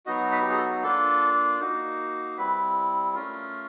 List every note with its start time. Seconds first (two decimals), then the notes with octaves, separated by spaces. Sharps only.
0.06 F#3 B3 D#4 F#4 D#5
0.32 B4
0.42 G4
0.49 G#4
0.57 A4
0.82 A#3 D4 F4 A4
1.60 A#3 D#4 F#4
2.37 G3 C4 E4 B4
3.15 A3 C#4 F4 A#4